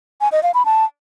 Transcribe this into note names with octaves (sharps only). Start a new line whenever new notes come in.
G#5
D#5
F5
B5
A5